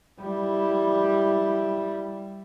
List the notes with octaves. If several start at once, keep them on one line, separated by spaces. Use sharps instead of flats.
G3 E4